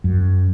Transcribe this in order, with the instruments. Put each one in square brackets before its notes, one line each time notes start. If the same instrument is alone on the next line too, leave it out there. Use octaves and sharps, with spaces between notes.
[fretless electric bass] F#2